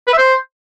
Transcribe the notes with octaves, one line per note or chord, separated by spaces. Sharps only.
B4
E5
C5